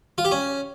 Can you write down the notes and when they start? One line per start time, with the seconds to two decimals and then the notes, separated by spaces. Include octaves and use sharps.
0.18 F4
0.25 G4
0.31 C#4